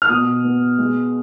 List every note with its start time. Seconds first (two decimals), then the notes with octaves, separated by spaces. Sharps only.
0.02 F6
0.09 B2 D#6
0.44 B3
0.78 G#3